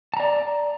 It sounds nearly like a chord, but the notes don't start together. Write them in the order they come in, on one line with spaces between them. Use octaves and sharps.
A5 A#5 D5